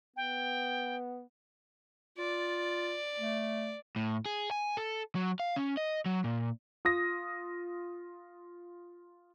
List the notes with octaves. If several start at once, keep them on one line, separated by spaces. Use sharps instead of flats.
B3 G5
F4 D5
A3
A2
G#4
G#5
A4
F#3
F5
C#4
D#5
F#3
A#2
F4 D#6 A#6